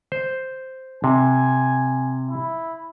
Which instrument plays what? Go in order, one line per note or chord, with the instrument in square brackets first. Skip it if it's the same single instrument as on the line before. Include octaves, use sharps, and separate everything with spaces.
[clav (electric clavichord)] C5
[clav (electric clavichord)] C3 [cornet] G#5
[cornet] E4